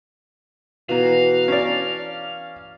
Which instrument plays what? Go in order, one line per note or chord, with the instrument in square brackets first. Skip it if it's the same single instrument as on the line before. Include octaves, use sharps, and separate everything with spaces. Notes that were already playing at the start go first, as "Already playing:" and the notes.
[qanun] B2 E3 A#5 [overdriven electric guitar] F5
[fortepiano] C#4 D5 [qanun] A5 A#5